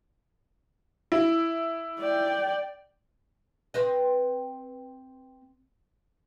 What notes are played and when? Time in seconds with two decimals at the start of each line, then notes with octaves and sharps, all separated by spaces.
1.12 E4
2.00 D5 G5
3.74 C4 B4 D#5